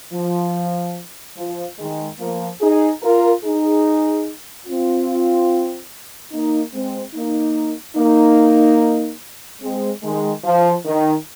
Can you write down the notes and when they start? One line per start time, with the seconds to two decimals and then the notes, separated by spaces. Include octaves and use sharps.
0.13 F3
1.36 F3
1.78 D#3 G#3
2.19 F3 A#3
2.61 D#4 G#4
3.02 F4 A#4
3.43 D#4 G#4
4.66 C4 F4
6.32 A#3 D#4
6.73 G#3 C4
7.14 A#3 D#4
7.96 A#3 D#4
9.61 G#3 C4
10.03 D#3 G#3
10.44 F3
10.85 D#3